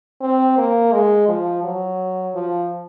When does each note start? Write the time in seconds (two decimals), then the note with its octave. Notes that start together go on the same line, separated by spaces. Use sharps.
0.21 C4
0.58 A#3
0.93 G#3
1.28 F3
1.64 F#3
2.35 F3